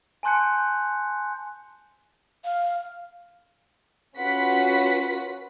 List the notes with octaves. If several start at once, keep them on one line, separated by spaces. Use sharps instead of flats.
G#5 A5 C6 F#6 G6 C#7
F5
C#4 F4 F#4 B4 F#5 B6